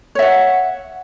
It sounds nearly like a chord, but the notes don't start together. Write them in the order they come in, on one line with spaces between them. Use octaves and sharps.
C#5 E5 F#5